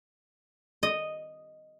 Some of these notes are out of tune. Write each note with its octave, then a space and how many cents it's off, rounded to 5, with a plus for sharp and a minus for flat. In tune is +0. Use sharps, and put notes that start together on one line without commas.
D#5 -5